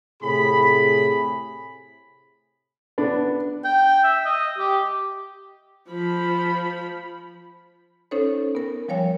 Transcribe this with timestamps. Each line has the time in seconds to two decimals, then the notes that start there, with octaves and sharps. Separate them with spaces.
0.23 A2 C3 G#4 B5
2.98 B3 D4
3.64 G5
4.03 E5
4.25 D#5
4.58 G4
5.89 F3 B5
8.11 C#4 D#4 A4 C5 C#5
8.55 B3 A#4
8.88 F3 G3 A#4 C#5 F5 G#5